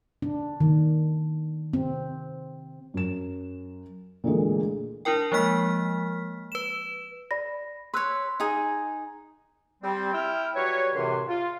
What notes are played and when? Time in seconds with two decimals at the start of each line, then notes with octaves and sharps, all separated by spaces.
0.22 D4
0.60 D#3
1.73 C4
2.94 F#2 E7
4.24 A#2 D3 E3 G#3 A3
5.05 D4 E4 A#4 G5
5.32 F3 G#3 A#3 F6 B6
6.52 B4 E7
7.31 D5 B5 A#6
7.94 B4 C#5 C6 E6 F#6
8.40 D#4 G#4
9.82 G3 C4
10.13 E4 G5 F6
10.54 F#3 G3 B4 C#5
10.94 C#2 F#2 A2 C3 E3 C6
11.28 F4